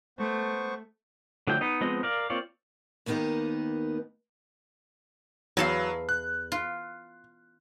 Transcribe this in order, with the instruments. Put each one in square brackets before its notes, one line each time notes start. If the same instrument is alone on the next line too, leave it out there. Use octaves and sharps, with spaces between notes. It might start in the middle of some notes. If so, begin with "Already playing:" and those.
[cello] A3 [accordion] B3 C5 C#6
[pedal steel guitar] D3 F3 F#3 A3 G5
B3 D#4 D#5
F3 G#3 B3 C4 D#5
A#4 D5 F5
A#3 C4 F4 C#5 D5
[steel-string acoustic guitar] D#2 A#3 B3 D#4 G4 D#5
[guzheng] E2 A4 F5 [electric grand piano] F#3
[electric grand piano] F#6
[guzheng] F4